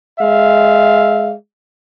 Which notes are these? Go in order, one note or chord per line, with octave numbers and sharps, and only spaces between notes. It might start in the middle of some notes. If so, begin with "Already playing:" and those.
G#3 E5 F5